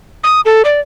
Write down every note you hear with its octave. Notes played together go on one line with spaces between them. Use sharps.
D#6
A4
D5